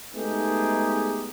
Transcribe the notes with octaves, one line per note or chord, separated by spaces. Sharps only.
G#3 A3 B3 D#4 G4 G#4